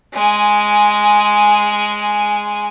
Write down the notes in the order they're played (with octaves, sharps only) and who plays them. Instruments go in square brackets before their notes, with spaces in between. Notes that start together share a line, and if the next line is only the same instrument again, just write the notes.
[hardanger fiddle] G#3 G#5